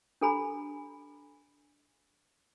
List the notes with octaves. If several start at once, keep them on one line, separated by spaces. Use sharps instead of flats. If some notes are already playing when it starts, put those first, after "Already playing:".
D4 G4 A4 G#5 A#5 B5